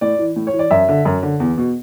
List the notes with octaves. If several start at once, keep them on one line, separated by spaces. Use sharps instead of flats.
A2 D5
E3
A2
C#5
E3
D5
F#2 E5
D3
F#2
D3
E2
B2